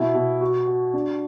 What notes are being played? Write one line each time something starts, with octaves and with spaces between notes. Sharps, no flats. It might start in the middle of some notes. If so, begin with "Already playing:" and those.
Already playing: B2 E4
B2
F#4
F#4
D4